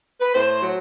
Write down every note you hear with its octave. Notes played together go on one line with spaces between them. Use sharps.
B4
A2 C5
F#3